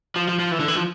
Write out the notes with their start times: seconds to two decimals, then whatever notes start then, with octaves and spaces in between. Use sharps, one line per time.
0.16 F3
0.28 F3
0.39 F3
0.51 E3
0.60 D3
0.68 E3
0.77 F3